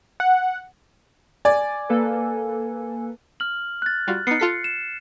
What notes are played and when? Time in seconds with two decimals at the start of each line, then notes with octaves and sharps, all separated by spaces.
0.20 F#5
1.45 D5 G#5
1.89 A#3 A4 B4
3.40 F6 F#7
3.82 F#6 A6
4.07 G3 F4 F#4
4.27 B3 D#4 C7 C#7
4.40 F4 A4 B6
4.64 E7